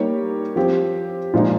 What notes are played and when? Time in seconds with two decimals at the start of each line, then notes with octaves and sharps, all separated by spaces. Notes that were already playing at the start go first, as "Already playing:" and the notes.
Already playing: G3 A#3 D#4 G4 C#5
0.56 F3 C4 G4
1.34 A#2 F3 G#3 D#4